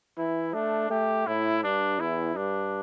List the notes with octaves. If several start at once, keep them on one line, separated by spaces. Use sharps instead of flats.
E3 E4
A3 D4
A3 G4
A2 E4
G2 D4
E2 E4
G2 D4